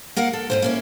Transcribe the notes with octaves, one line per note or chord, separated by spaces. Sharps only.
A#3 A#4 F5 F#5
A4
G#2 E3 C5
A#3 C#4 E4